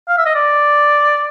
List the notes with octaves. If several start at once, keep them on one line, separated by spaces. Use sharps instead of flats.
F5
E5
D#5
D5